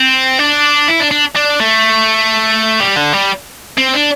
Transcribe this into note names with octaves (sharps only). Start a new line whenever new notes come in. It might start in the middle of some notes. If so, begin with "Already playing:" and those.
Already playing: C4
D4
E4
D4
D4
D4
A3
G3
D3
G3
C4
D4